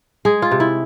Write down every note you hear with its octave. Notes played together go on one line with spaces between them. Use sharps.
G#3 G#4
F4
C3
E4